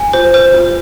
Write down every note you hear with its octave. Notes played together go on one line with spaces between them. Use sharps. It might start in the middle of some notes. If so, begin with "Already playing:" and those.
Already playing: G#5
F4 C5
B4 C5
F4